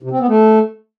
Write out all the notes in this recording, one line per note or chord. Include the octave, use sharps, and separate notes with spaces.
C3
C4
B3
A3